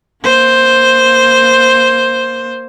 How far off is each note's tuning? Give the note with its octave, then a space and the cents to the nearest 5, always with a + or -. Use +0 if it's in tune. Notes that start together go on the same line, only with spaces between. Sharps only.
A#3 +0 C5 +0